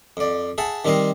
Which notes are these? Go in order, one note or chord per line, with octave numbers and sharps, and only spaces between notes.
F2 D5
G#4 E5 F#5 A5
D#3 G3 C4 A#4 D#5 C6